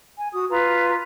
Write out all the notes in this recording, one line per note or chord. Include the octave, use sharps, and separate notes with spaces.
G#5
F#4 D#6
F4 B4 A#5